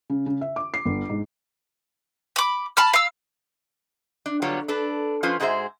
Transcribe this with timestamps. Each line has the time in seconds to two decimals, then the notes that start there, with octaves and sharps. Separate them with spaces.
0.10 C#3
0.26 C#3
0.41 E5
0.56 D6
0.74 C7
0.85 G1
1.10 G#2
2.36 B5 D6
2.77 A5 B5 F6
2.94 F5 E6
4.26 D4
4.42 D3 F#3 G3 B3 F4 C#5
4.68 D4 A4 B4
5.23 F3 C#4 F4 B4 C5
5.40 G#2 G#3 F#4 G#4 C5 E5